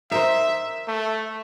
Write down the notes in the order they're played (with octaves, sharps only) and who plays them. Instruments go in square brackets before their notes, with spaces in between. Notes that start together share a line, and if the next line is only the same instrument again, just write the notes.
[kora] D#4 A#4 C5 [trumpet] E5
[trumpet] A3